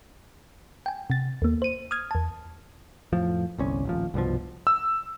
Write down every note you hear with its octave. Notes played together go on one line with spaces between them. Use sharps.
G5 G#5
C3 A6
D#2 A#3
C5 D#7
D#6 F6 G#6
E2 A5
F2 A2 F3
G1 C2 C#4
D#1 A1 F3
C2 G2 B2 F3
E6